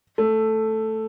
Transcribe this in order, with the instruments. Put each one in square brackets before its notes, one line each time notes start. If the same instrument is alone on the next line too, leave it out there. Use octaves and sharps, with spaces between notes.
[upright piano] A3